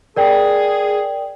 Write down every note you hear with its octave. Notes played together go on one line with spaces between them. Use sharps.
G#4 A#4 D5 G5